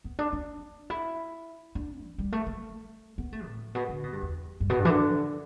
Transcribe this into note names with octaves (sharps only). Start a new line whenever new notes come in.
B3
D4
D4
E4
D4
E3
G3
A3
A3
B3
A3
A2
B2
D3
B2
G2
E2
G2
B2
G2
E3
D3